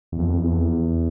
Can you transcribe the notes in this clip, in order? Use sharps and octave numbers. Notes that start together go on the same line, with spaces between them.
E2
F2
F2
E2
F2
E2